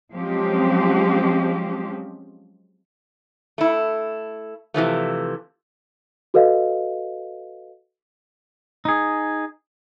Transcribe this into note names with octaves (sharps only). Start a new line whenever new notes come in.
F3 F#3 G#3 C4 C#4 G4
A3 E4
C3 E3 F3 A3
F#4 A4 B4 D#5 F5
D#4 G#4